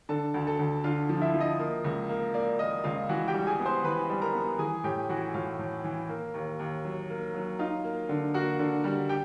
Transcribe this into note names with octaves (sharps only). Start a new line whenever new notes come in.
D3 A4 A5
D2
A4 A5
D2
D3 F4 F5
F3
E4 E5
F3
D#5
A#3
C#2
A#3
A#3 D5
A#3 D#5
C#2 F4 F5
E3 F#4 F#5
G4 G5
G3
G#4 G#5
B3
C5 C6
E3 B4 B5
G3
A#4 A#5
B3
E3 G#4 G#5
A2 G4 G5
E3 F#4 F#5
A2 F4 F5
A2
E3
A#3
D#2
D#2
F#3
A#3
F#3
D#4 F4 F5
A#3
D3
A#3 F#4 F#5
D3
G3
G4 G5